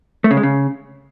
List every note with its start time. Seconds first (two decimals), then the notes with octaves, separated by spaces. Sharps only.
0.24 A3
0.31 C#3
0.37 G#3
0.43 C#3